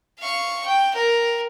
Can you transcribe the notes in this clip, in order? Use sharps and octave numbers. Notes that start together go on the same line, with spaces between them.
F5 C#6
G5
A#4